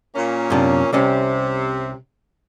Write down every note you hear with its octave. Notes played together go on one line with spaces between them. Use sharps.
A#2 A#3 C#4
F#2 C3 D4
C2 C3 G3 C#4